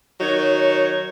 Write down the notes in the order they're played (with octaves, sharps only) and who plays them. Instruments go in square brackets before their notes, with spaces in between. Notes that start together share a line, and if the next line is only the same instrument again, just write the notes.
[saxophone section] D#3 F#3 D#4 C#5